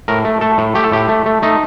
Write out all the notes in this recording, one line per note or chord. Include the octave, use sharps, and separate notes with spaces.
A2 A#4
A3
A3 A4
A2
A3 G4
A4
A2 G4
A3
A3
A3 D#4